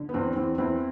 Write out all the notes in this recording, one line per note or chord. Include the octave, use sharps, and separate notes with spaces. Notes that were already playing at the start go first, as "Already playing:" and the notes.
Already playing: D3
B3
E2 C4
E2 C4
E2 C4 E4